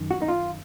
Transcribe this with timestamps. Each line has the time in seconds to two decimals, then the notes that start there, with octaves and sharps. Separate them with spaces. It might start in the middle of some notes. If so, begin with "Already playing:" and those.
Already playing: F#2 D#3
0.11 F#4
0.22 D#4
0.28 F4